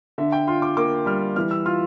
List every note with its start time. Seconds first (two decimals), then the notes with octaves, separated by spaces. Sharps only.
0.18 D3 E5
0.32 G5
0.48 F4 C6
0.62 D6
0.77 A#3 D6
1.06 G3 F6
1.36 E3 F6
1.51 E6
1.66 F4 F6